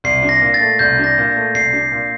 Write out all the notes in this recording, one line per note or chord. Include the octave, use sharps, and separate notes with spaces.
C2 C7
D4
A#6
A#2
A6
A3
C2 G6
D4
A#6
A#2
A3
C2 C7
D4
A#2